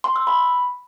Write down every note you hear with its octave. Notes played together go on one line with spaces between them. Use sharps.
C6
E6
B5